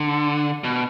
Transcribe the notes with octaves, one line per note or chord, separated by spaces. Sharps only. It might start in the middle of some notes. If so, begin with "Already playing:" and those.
Already playing: D3
B2